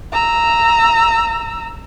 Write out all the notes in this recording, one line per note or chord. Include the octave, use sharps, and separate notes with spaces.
A#5 E6